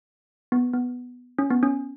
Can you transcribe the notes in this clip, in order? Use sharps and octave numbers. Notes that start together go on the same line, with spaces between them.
B3
B3
C#4
B3
C#4